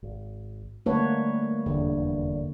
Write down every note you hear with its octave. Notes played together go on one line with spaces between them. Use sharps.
G#1
D3 G3 A3 A#3 B4 C#5
F1 E2 G2 D3